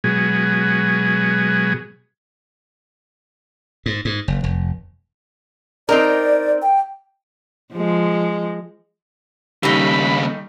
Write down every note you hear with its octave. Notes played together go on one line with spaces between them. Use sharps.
B2 F#3 G#3 G#4
G#2
G#2
F#1
F1
C4 D#4 A#4 D5
G5
F3 G#3
D#2 C#3 G3 A3 D#4 B5